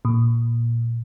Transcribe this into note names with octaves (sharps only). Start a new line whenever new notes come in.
A#2